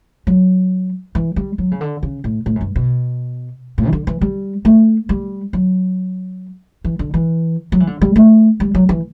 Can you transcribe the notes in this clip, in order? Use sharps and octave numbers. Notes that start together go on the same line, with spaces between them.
F#3
E3
G3
F#3
C#3
D3
C#3
A2
A2
F#2
G2
B2
A2
E3
D3
E3
G3
A3
G3
F#3
E3
D3
E3
F#3
E3
D3
G3
A3
G3
F#3
E3